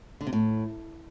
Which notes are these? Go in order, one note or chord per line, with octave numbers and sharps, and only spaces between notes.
D3
C3
A2